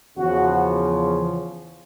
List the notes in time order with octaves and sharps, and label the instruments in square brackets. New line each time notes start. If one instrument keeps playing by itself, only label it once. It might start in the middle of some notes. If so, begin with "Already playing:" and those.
[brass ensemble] E2 C#3 F3 F#4